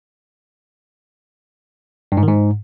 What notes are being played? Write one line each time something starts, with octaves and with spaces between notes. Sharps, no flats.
G2
G#2
D#3
G#2